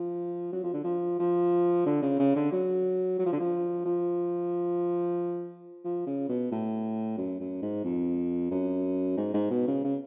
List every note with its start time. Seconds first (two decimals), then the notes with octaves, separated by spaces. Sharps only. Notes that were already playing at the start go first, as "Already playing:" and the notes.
Already playing: F3
0.53 F#3
0.63 F3
0.73 D3
0.84 F3
1.19 F3
1.86 D3
2.02 C#3
2.19 C#3
2.36 D3
2.52 F#3
3.19 F#3
3.25 F3
3.33 D3
3.40 F3
3.85 F3
5.85 F3
6.07 C#3
6.29 B2
6.51 A2
7.18 F#2
7.40 F#2
7.62 G#2
7.84 F2
8.51 F#2
9.17 G#2
9.34 G#2
9.50 B2
9.67 C#3
9.84 C#3